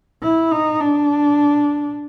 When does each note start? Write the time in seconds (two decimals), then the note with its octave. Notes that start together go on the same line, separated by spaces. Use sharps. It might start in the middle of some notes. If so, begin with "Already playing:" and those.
0.23 E4
0.51 D#4
0.80 D4